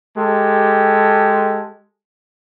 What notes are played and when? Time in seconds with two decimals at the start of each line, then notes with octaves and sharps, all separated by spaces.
0.17 G#3 G4 A4